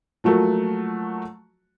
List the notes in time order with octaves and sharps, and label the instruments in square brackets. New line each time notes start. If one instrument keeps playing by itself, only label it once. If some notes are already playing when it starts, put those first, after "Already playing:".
[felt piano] F3 F#3 A3 A#3 F#4